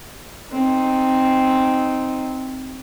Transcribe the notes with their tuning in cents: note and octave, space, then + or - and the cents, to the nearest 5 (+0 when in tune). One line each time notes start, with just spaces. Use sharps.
C4 +0 D#4 +0